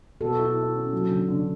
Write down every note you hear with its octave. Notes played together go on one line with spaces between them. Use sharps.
B2 F#4 A4
E4
E4
C#4
F#3
D3
D3